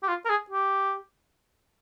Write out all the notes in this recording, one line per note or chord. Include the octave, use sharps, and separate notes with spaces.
G4
F4
A#4
G#4
G4